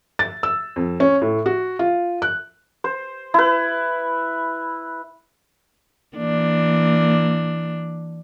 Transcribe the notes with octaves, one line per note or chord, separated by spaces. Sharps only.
A6
E6
F2
C#4
A2
F#4
F4
F#6
C5
E4 B4
E3 A#3 D4